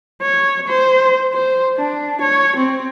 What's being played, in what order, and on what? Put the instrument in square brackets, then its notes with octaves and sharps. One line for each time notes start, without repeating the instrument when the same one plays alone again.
[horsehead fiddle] C#5
C5
C5
D4
C#5
C4